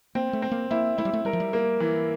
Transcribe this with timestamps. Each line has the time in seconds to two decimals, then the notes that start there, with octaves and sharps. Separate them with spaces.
0.15 A#3 C4
0.33 A3
0.42 C4
0.51 A#3
0.71 A#3 E4
0.98 A3 E4
1.05 G3
1.13 A3
1.25 G3 A#4
1.33 F3
1.40 G3
1.53 A#3
1.80 E3